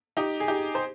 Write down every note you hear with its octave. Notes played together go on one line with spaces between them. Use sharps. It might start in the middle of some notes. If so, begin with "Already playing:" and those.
D#4 G4
G#4
D#4 G4
C5